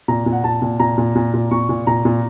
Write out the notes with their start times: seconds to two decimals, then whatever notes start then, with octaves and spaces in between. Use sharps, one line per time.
0.08 A#2 A#5
0.26 A#2
0.33 F#5
0.44 A#2 A5
0.62 A#2
0.79 A#2 A#5
0.98 A#2
1.15 A#2
1.33 A#2
1.51 A#2 C#6
1.69 A#2
1.87 A#2 A#5
2.05 A#2